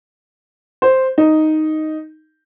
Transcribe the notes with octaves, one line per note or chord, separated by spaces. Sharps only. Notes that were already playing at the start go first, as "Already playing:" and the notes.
C5
D#4